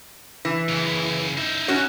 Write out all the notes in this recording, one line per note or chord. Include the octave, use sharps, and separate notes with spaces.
E3
F#2 C#3
D#4 E5
C#4 F#4 C#5